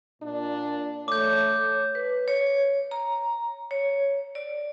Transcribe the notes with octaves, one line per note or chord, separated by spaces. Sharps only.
A#2 D4
A3 C#5 D6 G6
B4
C#5
A#5
C#5
D5